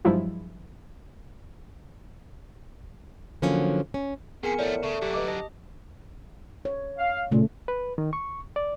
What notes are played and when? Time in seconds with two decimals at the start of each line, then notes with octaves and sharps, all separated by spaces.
0.05 G2 F3 F#3 G#3 E4 F4
3.42 D3 F3 F#3 A#3 C#4
3.94 C#4
4.43 F2 B3 G#4 A#4 G#5 C#7
4.59 A2 F3 A3 D5
4.83 C#3 A3
5.02 F#2 D3 G4
5.14 B4 D#5 D6
5.28 D#5 A5
6.65 C#5
6.97 F5
7.31 A#2 C#3 A3
7.68 B4
7.98 D#3
8.13 C#6
8.56 D5